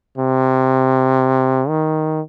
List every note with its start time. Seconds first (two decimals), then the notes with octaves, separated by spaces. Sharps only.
0.18 C3
1.68 D#3